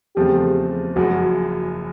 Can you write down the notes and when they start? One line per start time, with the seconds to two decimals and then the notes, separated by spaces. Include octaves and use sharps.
0.16 E2 C#3 F3 A3 C4 G4
0.96 F#1 F#2 C#3 F3 G#3 F#4